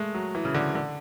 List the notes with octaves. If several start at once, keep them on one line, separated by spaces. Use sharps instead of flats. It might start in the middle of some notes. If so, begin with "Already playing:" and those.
Already playing: G#3 A3
F#3
E3
C#3
D3
D3